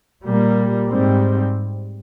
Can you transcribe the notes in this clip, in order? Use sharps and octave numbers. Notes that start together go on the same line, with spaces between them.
A#2 G3 A#3
G#2 G3 C4